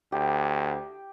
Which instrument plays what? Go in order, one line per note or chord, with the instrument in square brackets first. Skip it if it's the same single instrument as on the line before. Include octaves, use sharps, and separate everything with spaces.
[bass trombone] D2 [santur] G4